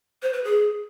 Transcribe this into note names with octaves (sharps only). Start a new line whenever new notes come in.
C5
B4
G#4